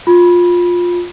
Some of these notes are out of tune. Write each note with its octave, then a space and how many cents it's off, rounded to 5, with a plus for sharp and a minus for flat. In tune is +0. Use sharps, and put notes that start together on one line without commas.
F4 +15 B5 -15